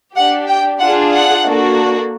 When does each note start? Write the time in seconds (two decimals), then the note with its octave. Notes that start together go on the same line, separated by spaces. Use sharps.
0.16 D4 G4 F#5
0.49 G5
0.80 D4 F4 G#4 F#5
1.13 F#5
1.44 A#3 D4 F#4 A4